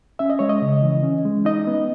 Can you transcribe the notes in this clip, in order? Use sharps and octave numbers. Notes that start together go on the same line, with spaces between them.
C#4 E5
D#5
G#3 C#5
D#5
C#3
E3
C#4
G#3
D#4 D#5
B3